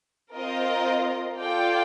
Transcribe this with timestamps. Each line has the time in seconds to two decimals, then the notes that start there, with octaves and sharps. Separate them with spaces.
0.34 C4 F4 A#4 D#5
1.35 F4 A4 D5 G5